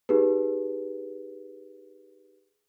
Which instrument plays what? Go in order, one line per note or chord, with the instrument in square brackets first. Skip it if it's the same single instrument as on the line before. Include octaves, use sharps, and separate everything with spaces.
[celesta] D#4 G4 G#4 B4